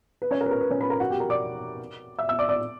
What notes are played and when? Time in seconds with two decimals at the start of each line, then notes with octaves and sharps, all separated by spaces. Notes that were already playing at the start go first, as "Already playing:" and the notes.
0.22 B4
0.31 C#4 C#5
0.41 A#4
0.46 B4
0.51 A#4
0.61 B4
0.71 C#4 C#5
0.81 B4 B5
0.90 A#4 A#5
1.00 F#4 F#5
1.10 G4 G5
1.20 A#4 A#5
1.30 D5 D6
2.18 E5 E6
2.29 E5 E6
2.38 D5 D6
2.49 D5 D6